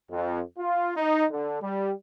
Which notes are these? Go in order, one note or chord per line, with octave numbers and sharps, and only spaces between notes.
F2
F4
D#4
D3
G3